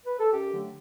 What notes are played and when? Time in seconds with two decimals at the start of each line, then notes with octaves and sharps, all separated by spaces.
0.06 B4
0.19 A4
0.33 F#2 G4
0.52 D3 F#3 A3 D4